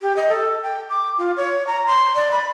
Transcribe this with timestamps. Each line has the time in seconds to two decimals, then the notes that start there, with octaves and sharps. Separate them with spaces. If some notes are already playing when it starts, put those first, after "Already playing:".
0.01 G4
0.16 D#5
0.29 A4
0.63 G5
0.90 D6
1.18 F4
1.37 C#5
1.67 A#5
1.86 C6
2.15 D5
2.31 B5